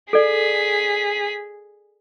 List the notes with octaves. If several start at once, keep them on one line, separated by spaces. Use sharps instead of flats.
G#4 A4 D5 B6